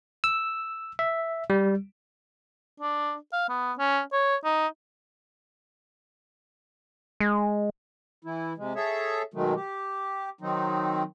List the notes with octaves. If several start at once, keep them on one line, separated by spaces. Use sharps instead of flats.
E6
E5
G3
D4
F5
B3
C#4
C#5
D#4
G#3
E3 E4
C3 G#3
G#4 A4 C#5 E5
B2 D#3 F#3 G#3 A3
G4
D#3 F#3 C4 D#4